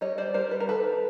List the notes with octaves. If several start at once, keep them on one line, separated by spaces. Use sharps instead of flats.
G3 C#5 D#5
C5 D5
G3 A#4 C5
B4
A#4
D#3 A4 B4